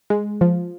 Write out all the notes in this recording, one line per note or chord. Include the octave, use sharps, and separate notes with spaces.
G#3
F3